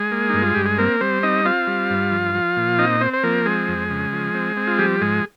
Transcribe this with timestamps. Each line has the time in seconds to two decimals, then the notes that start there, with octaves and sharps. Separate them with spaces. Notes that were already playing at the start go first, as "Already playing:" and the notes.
Already playing: G#3 G#4
0.12 A#3
0.29 G2 D#4
0.42 F4
0.54 G2 G4
0.66 G#4
0.78 A#3 C4 A#4
1.00 G3 C4 C5
1.23 C4 D#4 D#5
1.45 C4 F4 F5
1.67 G3
1.90 G2
2.11 F3
2.35 F3
2.57 A#2
2.78 C4 D#4 D#5
3.01 C4 C5
3.13 C5
3.23 F3 A#3 A#4
3.45 G#3 C4 G#4
3.68 F2
3.90 C#3
4.13 F3
4.34 C4
4.57 C4
4.67 F4
4.78 F3 G3 G4
5.01 G#2 G#3 G#4